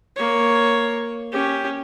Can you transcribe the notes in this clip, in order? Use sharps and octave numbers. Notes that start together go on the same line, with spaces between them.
A#3 C#5
C#4 G4